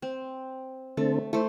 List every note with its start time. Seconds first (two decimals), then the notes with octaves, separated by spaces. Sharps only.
0.02 C4
0.97 D3 A3 C4 A4
1.33 A3 E4 C5